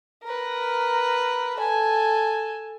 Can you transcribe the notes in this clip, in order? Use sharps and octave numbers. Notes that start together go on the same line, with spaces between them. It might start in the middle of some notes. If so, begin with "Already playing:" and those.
A#4 B4
A4 G#5